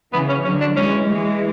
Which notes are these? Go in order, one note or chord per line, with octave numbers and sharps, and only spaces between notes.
C#3 E3 B3
C#4
D3 F#3 C#4
D4
E3 G#3 C#4
E3 G#3